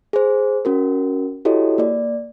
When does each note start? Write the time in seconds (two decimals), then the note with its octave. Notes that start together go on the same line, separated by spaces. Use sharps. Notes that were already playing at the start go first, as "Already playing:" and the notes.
0.13 G#4 C5
0.65 C#4 F#4 A#4
1.45 E4 F#4 G4 A4 C#5 D#5
1.78 A#3 D5